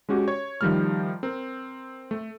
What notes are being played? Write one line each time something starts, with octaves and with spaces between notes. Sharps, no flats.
G#3 C#4 F#4 G4
C#5
D#3 F3 G3 A3 F6
C4 A#4
A3